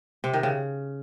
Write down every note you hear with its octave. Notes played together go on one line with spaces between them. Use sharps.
C3
D#3
C#3